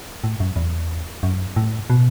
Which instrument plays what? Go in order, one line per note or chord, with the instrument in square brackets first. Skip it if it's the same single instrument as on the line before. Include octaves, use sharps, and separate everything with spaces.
[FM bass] A2
F#2
E2
F#2
A2
B2